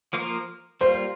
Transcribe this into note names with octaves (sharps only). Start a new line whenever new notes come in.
F3 A#3 F4 A#4
G3 A#3 F4 C5